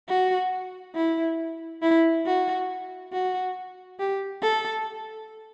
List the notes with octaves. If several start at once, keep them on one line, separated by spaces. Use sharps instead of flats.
F#4
E4
E4
F#4
F#4
G4
A4